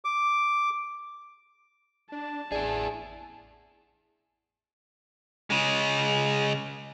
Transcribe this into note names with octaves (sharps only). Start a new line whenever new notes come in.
D6
D4 A5
A1 E4 G#4 D5
C#3 G#3